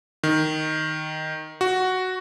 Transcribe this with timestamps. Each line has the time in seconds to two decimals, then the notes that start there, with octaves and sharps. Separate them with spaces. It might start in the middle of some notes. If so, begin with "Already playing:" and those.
0.23 D#3
1.61 F#4